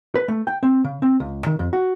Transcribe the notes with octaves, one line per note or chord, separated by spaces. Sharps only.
B4
A3
G5
C4
C#3
C4
C#2
D#3
F2
F#4